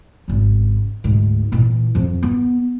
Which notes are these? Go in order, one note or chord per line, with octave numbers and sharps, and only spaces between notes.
G#1 C#3
D2 G#2
A#2 E3
F2 F3
B3